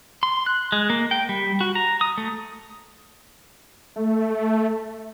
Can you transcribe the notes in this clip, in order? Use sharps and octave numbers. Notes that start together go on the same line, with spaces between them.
C6
F#6
G#3
A#3
G5
G3
F#4
A#5
D#6
A3
A3